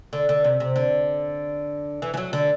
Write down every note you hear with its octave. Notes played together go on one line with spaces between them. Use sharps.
D3
D3
C3
C3
D3
E3
E3
F#3
D3